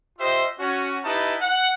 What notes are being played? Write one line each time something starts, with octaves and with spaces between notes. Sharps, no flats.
F4 G4 C5 D#5 E5
C#4 F#4
D#4 E4 G4 B4 D#5 A5
F#5